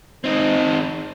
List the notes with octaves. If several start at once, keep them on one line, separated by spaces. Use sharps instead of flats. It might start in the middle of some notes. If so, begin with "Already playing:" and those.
C4 D#4